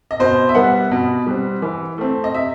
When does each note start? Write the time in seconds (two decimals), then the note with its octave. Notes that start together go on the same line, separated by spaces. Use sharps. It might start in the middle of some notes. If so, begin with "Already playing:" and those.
0.11 D#5
0.19 B2 C5
0.49 E5
0.55 G3 B3 F#5
0.91 B2
1.26 G3 C4
1.62 E3
1.98 A3 C4
2.24 D#5
2.34 C3 E5